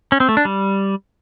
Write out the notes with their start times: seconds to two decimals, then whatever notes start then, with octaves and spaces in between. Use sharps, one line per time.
0.12 C#4
0.20 C4
0.29 A3
0.37 D4
0.45 G3